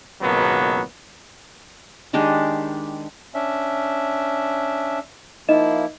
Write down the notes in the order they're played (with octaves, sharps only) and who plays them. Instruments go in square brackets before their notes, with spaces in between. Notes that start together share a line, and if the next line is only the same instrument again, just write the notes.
[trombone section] G#1 C#2 B2 F#3 A#3 B3
[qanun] D#3 G#3 D4 G4
[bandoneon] C#4 D4 E5
[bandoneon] F3 A#3 E4 [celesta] D#4 D#5 E7